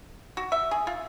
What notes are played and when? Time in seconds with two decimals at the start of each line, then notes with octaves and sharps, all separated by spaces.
0.37 F#4
0.52 E5
0.71 G#4
0.87 F4